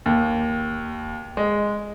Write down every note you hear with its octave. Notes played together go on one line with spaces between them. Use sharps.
D#2
G#3